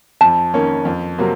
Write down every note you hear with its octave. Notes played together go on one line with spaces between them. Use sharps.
F2 A5
D#3 A#3 C#4
F2
C3 F#3 A#3